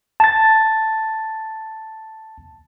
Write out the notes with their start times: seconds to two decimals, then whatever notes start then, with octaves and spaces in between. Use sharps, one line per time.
0.20 A5 A6